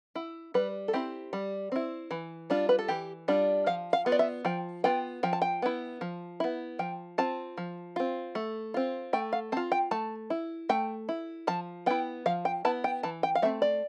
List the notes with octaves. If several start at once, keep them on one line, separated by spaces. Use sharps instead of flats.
E4
G3 B4
A4
C4 E4 G4
G3
C4 E4
E3
G3 D4 F4
B4
A4
E3 G4
G3 D4 F4
F3 F5
F5
B3 F4
D5
E5
F3 G5
B3 F4 G5
F3 G5
A5
G5
B3 E4
F3
B3 E4
F3 G5
C4 F4 A5
F3
C4 F4
A3
C4 F4
A3 G5
F5
C4 F4 A5
G5
A3 A5
E4
A3 G5
E4
F3 A5
B3 E4 G5
F3 F5
G5
B3 E4 A5
G5
E3 A5
G5
F5
A3 C4 E5
D5